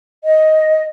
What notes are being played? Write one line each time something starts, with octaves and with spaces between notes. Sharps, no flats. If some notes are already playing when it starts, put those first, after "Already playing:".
D#5